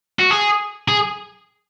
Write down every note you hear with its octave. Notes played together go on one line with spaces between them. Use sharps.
F#4
G#4
G#4